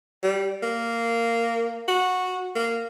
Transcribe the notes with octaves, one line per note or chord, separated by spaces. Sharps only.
G3
A#3
F#4
A#3